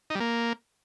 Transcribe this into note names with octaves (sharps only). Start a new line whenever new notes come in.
D#4
G3
A#3